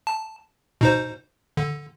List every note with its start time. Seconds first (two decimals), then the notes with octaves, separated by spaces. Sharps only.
0.07 A5
0.81 B2 D#4 C5
1.57 D3